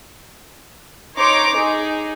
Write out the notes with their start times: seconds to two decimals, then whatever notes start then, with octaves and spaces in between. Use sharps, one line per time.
1.17 D#4 C#5 A#5 C6 D6
1.56 D#4 G#4